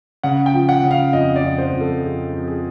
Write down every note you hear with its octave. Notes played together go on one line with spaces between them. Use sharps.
C#3 F#5
G5
F3
F#5
C#3
F5
F2 D#5
D5
F2
C5
F2
A4
F2 G#4
F2
G#4